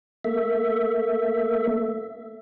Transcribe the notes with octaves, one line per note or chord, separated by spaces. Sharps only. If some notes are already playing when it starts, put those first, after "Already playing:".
A3 A#3 E5